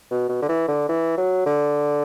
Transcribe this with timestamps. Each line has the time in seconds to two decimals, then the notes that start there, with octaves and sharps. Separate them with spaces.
0.11 B2
0.29 B2
0.42 D3
0.49 E3
0.68 D3
0.89 E3
1.17 F#3
1.46 D3